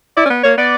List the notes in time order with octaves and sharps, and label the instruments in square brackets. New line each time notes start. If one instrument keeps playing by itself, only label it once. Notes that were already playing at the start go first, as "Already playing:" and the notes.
[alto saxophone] E4 [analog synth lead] D5
[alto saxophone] C#4
B3
[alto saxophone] A#3 [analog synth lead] C#5
[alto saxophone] B3 [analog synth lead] D5